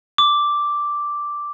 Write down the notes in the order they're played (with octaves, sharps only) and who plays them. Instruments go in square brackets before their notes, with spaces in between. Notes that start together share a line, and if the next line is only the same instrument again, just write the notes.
[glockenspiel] D6